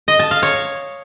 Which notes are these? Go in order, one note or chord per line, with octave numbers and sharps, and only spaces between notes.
D#5
A5
F5
C#5